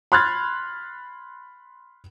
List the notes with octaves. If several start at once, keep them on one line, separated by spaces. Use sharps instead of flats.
B5 C6 F6 F#6 G#6 A6